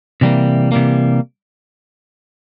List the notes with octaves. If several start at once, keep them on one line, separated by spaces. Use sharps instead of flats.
C3 E3 G3 A#3
C3 E3 G3 A#3